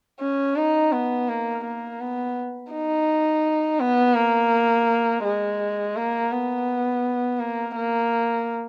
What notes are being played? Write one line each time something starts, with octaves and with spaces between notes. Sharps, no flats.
C#4
D#4
B3
A#3
A#3
B3
D#4
B3
A#3
G#3
A#3
B3
A#3
A#3